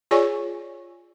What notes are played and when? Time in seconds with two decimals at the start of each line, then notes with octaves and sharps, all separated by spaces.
0.11 F4 G#4 C#5 D5 G#5 C#6